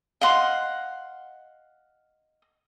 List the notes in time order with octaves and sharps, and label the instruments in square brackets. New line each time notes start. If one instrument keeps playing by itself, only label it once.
[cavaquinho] D#5 F5 F#5 C6